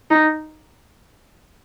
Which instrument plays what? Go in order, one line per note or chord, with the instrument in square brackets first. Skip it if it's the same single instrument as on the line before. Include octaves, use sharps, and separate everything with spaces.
[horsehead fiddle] D#4